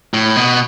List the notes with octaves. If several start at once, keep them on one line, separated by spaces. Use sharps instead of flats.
A2
B2